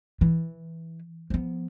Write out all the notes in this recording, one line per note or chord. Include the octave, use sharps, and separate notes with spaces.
E3
F3 B3